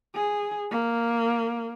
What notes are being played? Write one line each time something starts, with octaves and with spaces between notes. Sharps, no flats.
G#4
A#3